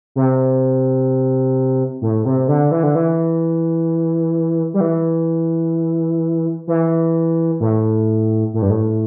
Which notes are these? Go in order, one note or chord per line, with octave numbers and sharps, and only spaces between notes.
C3
A2
C3
D3
E3
D3
E3
G3
E3
E3
A2
A2
G2
A2